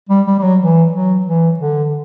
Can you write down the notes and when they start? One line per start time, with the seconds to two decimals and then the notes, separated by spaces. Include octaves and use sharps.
0.09 G3
0.26 G3
0.39 G3
0.43 F#3
0.60 E3
0.92 F#3
1.26 E3
1.59 D3